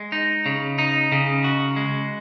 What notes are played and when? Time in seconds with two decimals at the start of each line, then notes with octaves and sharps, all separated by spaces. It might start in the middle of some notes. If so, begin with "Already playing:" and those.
Already playing: G#3
0.12 D#4
0.46 C#3
0.78 D#4
1.12 C#3
1.44 F#4
1.76 G#3